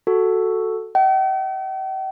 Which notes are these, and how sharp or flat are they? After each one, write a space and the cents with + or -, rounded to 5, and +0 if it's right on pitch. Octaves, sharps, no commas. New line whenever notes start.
F#4 +0 A4 +0
E5 -45 G5 -45